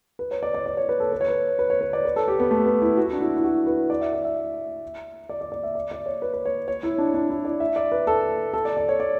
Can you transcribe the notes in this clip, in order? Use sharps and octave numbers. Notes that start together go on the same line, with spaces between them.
B4
C#5
D5
D5
D5
C#5
B4
A4
B4
C#5
B4
B4
C#5
B4
D5
B4
A4
G4
B3
A3
B3
E4
F#4
E4
D4
E4
E4
F#4
B4
D5
E5
D5
E5
D5
D5
D5
E5
D5
D5
C#5
B4
B4
C#5
C#5
E4
D4
D4
E4
D5
E5
D5
B4
A4
A4
D5
D5
C#5
D5